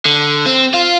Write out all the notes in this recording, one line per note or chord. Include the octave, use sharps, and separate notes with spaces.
D3
C4
F4